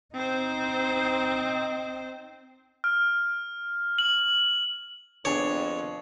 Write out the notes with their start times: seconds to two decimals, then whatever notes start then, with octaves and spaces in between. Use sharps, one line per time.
0.14 C4 D#4 C5
2.84 F6
3.98 F#7
5.25 F2 B3 D4 G#4 C#5